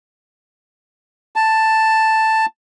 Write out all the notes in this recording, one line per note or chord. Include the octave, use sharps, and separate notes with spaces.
A5